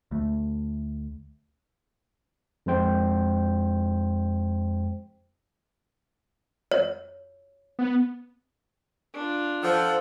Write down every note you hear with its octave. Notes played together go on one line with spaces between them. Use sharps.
D2 A3
F2 G#3 C5 G5
C#5
B3
D4 F4
F3 A4 C5 F#5